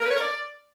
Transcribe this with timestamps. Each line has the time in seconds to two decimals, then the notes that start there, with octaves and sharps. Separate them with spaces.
0.01 A#4
0.06 B4
0.11 C#5
0.16 A#4
0.21 D5